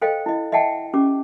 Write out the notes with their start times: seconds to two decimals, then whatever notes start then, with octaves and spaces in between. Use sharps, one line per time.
0.02 A4 C5 D#5 F5 G5
0.26 E4 D#5
0.52 D#5 E5 F#5 G5 A5
0.94 C#4 G4 D6